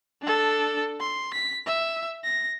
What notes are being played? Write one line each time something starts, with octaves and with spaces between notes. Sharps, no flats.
D4 A4
C6
B6
E5
A#6